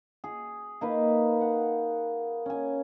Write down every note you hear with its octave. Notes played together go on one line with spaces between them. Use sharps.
G#4
A#3 D#4 B4
F#5
C#4 G#5